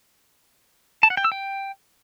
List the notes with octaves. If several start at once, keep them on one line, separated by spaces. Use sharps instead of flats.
A5
F#5
G5
E6
G5